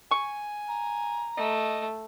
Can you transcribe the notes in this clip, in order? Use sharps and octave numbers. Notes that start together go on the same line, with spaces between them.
G#5 C#6
A#5
A3 D#5